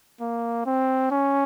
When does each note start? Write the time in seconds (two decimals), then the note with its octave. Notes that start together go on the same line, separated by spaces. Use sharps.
0.21 A#3
0.66 C4
1.11 C#4